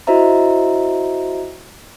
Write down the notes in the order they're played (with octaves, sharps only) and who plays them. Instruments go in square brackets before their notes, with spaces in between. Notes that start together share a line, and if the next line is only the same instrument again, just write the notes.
[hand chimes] E4 F#4 C5 D#5 E5 A#5